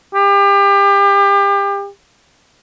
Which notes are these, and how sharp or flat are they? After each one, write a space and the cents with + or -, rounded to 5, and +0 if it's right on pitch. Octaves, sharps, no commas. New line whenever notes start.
G4 +30